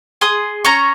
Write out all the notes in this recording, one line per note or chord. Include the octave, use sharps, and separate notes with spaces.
G#4 C6 D#6
C#4 A#5 C#6